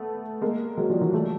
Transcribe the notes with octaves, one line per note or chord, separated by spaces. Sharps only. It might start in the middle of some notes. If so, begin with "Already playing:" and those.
Already playing: A3 B3
G#3 A#3
F#3 G#3
F3 G3
E3 F#3
G3 A3